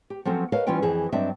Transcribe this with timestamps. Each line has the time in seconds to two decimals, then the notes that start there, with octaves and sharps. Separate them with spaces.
0.10 G4
0.25 F3 F#3 C4 C#4 A4
0.52 A#4 B4 C#5 D#5 F5 A5
0.67 E3 G3 C#4 F4 B4 G5
0.82 F2 E3 G#4
1.12 G2 F#3 C4 D4 D#5 E5